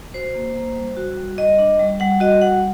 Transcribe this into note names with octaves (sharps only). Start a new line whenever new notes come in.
F#4 C5
A#3
A#3
G3
F#4
G3
G3 D#5
D4
G3
G3 F#5
F#4 D#5
G3 F#5